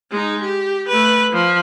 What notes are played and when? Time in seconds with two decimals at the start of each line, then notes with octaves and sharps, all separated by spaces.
0.11 G#3 D#4
0.41 G4
0.88 A3 B4
1.32 F3